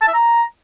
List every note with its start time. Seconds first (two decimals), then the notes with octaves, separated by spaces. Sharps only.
0.01 A5
0.08 E5
0.14 A#5